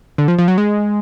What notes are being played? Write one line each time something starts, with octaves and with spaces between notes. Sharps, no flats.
D3
F3
F3
F#3
G#3